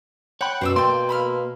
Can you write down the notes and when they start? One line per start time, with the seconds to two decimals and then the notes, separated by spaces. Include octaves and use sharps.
0.41 C#5 F#5 G5 B5
0.61 F#2 B2 C5 D5 E6
0.76 A#3 D5 G5 C6
1.09 B5 E6 F6